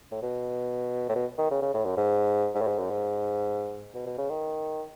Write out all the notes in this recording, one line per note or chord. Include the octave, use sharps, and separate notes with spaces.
A2
B2
A2
B2
D#3
C#3
C#3
A2
F#2
G#2
G#2
A2
G#2
F#2
G#2
B2
B2
C#3
D#3